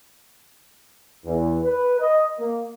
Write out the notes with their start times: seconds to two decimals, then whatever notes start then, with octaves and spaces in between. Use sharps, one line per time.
1.26 E2
1.63 B4
1.99 D#5
2.39 A#3